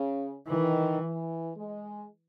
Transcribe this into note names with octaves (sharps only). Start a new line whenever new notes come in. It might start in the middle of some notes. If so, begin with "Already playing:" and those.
Already playing: C#3
D#3 E3
E3
G#3